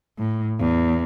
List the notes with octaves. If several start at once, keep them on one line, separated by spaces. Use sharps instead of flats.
A2
E2